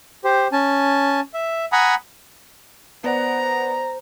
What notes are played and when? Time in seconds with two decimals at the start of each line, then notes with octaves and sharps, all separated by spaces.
0.24 G4 C5
0.52 C#4 G#5 A5
1.34 E5
1.72 F#5 G#5 A#5 B5 D#6
3.04 B3 C5 D5 F#5 A#5